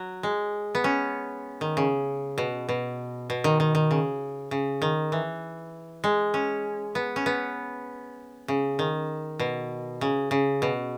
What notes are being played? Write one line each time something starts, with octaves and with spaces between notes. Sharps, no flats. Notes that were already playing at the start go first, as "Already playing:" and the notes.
Already playing: F#3
G#3
B3
C#4
D#3
C#3
B2
B2
B2
D#3
D#3
D#3
C#3
C#3
D#3
E3
G#3
C#4
B3
C#4
B3
C#3
D#3
B2
C#3
C#3
B2